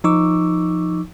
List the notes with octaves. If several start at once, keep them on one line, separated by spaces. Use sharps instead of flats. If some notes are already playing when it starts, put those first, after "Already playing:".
F3 D#4 C#6 D6 E6